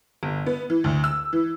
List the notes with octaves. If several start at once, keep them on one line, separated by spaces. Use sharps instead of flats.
G1
B3
E3
D2
E6
E3